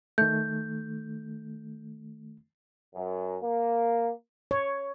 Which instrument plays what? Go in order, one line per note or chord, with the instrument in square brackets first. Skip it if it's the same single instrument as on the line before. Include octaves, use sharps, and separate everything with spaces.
[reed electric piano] D#3 A3 [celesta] G6
[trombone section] F#2
A#3
[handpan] C#5